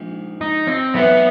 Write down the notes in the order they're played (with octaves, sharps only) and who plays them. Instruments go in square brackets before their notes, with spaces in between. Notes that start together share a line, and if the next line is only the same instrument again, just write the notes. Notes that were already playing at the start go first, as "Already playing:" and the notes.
Already playing: [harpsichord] A#1 G#2
[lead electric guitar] D#4
C4
[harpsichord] B1 A2 E3 [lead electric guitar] B3